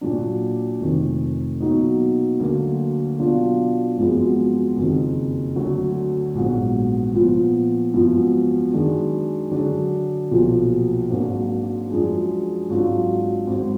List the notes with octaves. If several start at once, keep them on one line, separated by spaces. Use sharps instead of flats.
A#2 F#3 D4
F1 F2 D#3
B2 F#3 A#3 D#4
D2 D3 F#3 A#3
B2 F#3 D4 F4
G#1 F#2 F3 G#3 B3
F#1 F2 D#3
D2 D3 F#3
A#1 G#2 F#3 B3
A#2 F3 B3
G#1 F#2 F3 B3
F#2 D#3 G#3 D4
D3 F#3 D4 G#4
B1 A#2 F3
G#1 G#2 F#3 A#3 D4
F#2 F3 G#3 D4 G#4
G#1 G#2 F#3 D4 F4
G#1 G#2 F#3